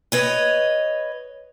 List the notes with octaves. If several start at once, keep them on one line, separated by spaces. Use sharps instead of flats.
B4 C#5 D#5